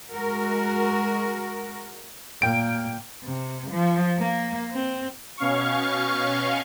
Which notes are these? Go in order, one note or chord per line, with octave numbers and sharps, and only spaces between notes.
G#3 F#4 A#4
A#2 A#3 G5 D7
C3
F3
A#3
C4
B2 C#4 F5 C#6